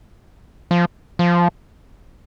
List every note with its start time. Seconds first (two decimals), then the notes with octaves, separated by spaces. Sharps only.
0.71 F3
1.19 F3